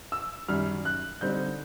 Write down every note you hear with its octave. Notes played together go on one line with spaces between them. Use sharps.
E6
F#2 D#3 G3 F6
F#6
D3 G3 C4 D#4 G6